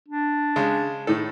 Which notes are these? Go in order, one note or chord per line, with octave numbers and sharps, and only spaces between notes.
D4
C#3 G#3
A2 D#3 A4